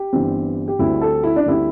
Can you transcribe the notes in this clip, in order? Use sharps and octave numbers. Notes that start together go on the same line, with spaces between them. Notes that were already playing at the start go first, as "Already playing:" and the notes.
Already playing: G4
G1 G2 E3 C4
G4
D2 D3 G3 C4 E4
A4
E4
D4
D2 D3 G3 C4 E4